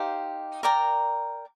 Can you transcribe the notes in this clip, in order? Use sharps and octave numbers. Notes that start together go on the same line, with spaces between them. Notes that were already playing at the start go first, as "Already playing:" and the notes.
Already playing: D#4 G4 C5 F5
A#4 D5 G5 A#5